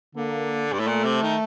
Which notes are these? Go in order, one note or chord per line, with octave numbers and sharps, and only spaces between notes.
D3 A#3
G2
A2
A#2 A3
C3
D#3